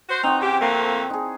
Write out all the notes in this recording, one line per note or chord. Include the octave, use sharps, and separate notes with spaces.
F#4 C5
C4 D#4 F#4
C#3 G4
F2 A3 A#3
D#4 G#4